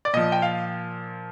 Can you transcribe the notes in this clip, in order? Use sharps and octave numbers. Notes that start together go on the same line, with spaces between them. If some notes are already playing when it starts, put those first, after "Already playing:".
D5
A#2 F3 D#5
G5
F5